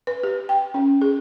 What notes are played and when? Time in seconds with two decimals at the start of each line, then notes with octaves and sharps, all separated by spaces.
0.07 B4
0.24 G4
0.49 G5
0.74 C#4
1.02 G#4